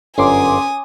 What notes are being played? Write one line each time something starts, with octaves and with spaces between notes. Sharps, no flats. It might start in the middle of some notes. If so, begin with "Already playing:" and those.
G1 F#2 C#4 G#5 C6 D6 D#6